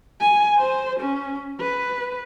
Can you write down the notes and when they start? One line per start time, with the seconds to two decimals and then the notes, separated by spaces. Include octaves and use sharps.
0.20 G#5
0.58 C5
1.00 C#4
1.60 B4